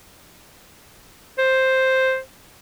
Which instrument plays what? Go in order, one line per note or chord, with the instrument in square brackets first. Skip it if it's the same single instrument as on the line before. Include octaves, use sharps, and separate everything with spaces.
[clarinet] C5